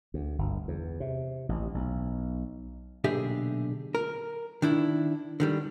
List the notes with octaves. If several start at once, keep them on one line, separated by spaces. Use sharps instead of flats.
D2
G1
E2
C3
A1
B1
B1 A#2 D3 G4 G#4 E5
A#4
D#3 D4 E4
D3 D#3 G3